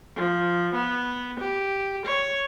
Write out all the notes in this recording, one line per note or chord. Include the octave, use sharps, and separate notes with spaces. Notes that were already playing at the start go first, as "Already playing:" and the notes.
F3
B3
G4
C#5